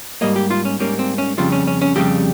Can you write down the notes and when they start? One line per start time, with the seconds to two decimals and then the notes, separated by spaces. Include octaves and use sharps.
0.21 G#2 G3 A#3 D#5
0.36 G4
0.51 F4
0.65 C#4
0.80 G#2 G3 A#3 C#4
0.99 C4
1.18 C#4
1.38 F2 C#3 G3 F4
1.52 C#4
1.67 C#4
1.82 C#4
1.96 F2 C#3 G3 G4